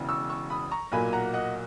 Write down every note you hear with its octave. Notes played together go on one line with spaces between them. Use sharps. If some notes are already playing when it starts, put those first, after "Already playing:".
Already playing: E1 E2 C#3 E3
C#6 E6
C#6 E6
B5 D#6
A#5 C#6
B1 A#2 F#3 A#3 G#5 B5
F#5 A#5
D#5 F#5